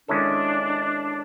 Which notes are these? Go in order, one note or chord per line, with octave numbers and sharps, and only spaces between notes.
D#3 G#3 C#4 D4 E4 A4